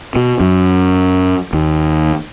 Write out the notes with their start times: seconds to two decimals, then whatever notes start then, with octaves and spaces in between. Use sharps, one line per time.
0.16 B2
0.40 F#2
1.53 D#2